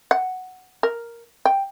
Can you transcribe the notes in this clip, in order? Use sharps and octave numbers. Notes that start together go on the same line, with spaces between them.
F#5
A#4
G5